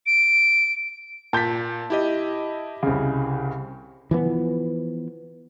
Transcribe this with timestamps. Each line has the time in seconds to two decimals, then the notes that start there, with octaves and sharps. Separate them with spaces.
0.06 D7
1.33 A#2 A5 G6 B6
1.90 E4 G4 D#5
2.83 C2 C#3
4.11 E3 F3 B3